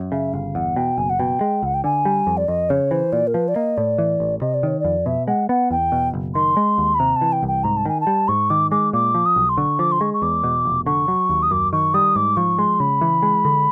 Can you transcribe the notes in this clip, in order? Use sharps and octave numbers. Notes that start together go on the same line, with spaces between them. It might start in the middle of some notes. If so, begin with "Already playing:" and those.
Already playing: F#2
C#3 E5
G1 F5
E2 F#5
B2 G5
F#1 G#5
F#5
B2 G5
G#3
C#2 F#5
G5
D3 G#5
G3
F2
D5
F2 D#5
C#3 C#5
E3 C5
A#2 D5
A#4
F3 B4
D5
A#3 D#5
A2 D5
E3
A1
C3 D#5
D5
D#3 C#5
F2 D5
B2 E5
G#3 F#5
B3 F#5
E2 G5
B2
F#1
D#3 C6
G#3
D#2
B5
C3 A#5
A5
E3
G5
C2
G5
G#2 A#5
A5
D#3 G#5
A5
G3
G#2 C#6
D#3 D6
G#3 D6
A#2 D6
F3
D#6
B1
C6
D3 C#6
F3 D6
C6
G#3 C#6
C#6
E2 D6
B2
F1
D3 C#6
F#3
D#2
D#6
F#2 D6
D#3 C#6
G3 D#6
G#2 D6
F3 C#6
G#3 C6
C#3 B5
E3
G#3
D3